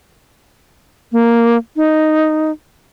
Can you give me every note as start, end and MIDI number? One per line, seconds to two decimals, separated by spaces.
1.12 1.57 58
1.76 2.52 63